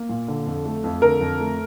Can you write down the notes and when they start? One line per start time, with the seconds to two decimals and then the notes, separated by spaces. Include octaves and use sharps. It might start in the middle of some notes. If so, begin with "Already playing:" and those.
Already playing: A#3
0.09 A#2
0.28 D3
0.46 F2
0.66 A3
0.84 F2
1.02 D3 A#4
1.21 F2
1.40 A3